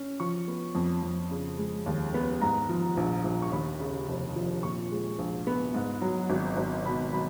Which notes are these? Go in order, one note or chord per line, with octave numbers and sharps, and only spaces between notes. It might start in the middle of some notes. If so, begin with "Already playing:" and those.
Already playing: C#4
F3 C#6
B3
F2
F2
C#3
G#3
D#2
B3
G#2 A#5
F3
A#1
A#1
C#6
D#2 B5
C#3
F1
F3
A#2 C#6
G#3
A#1
B3
G#2
F#3
G#1
G#1
B2 B5
F#3 B5